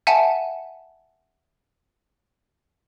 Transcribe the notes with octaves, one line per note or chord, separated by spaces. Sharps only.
E5 F#5 G#5 A5